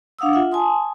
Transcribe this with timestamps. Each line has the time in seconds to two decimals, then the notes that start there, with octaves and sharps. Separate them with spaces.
0.19 D4 F5 F#5 D#6 E6
0.33 F4 E5 F#5
0.52 G#5 A5 C6 D#6